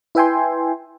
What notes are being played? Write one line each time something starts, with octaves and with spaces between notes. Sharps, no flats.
E4 B4 E5 G5 G#5 C6